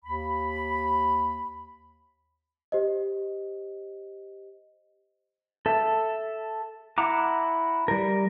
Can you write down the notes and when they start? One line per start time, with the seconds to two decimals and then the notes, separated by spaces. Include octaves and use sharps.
0.05 D#2 B5
2.72 G4 C5 D#5
5.66 A4 E5
6.98 E4 F#5 A#5 D6
7.88 G3 A#4